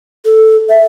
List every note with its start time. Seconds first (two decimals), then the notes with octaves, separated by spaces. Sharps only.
0.25 A4
0.69 E5